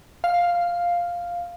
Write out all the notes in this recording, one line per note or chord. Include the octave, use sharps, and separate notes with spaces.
F5